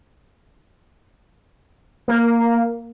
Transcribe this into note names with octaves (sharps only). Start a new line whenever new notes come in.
A#3